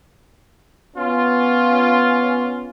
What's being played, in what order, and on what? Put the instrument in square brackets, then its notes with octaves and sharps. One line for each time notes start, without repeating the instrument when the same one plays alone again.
[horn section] B3 C#4 F4